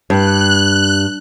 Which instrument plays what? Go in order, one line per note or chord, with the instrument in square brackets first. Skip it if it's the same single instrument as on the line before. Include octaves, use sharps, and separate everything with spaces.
[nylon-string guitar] G2 [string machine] F#6